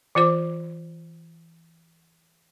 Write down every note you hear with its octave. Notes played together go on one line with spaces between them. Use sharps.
E3 F4 C5 D6